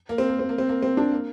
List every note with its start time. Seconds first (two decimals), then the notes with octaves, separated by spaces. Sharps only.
0.09 A#3
0.18 C4
0.29 A#3
0.39 C4
0.49 A#3
0.58 C4
0.69 A#3
0.82 C4
0.97 D4
1.12 A#3